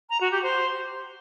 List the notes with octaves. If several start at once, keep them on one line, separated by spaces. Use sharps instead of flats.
A#5
F#4
G4
C5